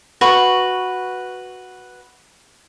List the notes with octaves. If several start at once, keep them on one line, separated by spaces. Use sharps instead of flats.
F#4 B4 C#6